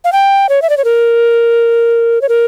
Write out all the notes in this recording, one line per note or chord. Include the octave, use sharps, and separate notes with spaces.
F5
G5
C#5
E5
D5
C#5
A#4
C#5
A#4